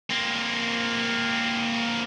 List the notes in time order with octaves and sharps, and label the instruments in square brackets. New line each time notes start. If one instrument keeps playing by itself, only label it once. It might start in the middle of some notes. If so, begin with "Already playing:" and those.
[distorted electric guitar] A#3 C4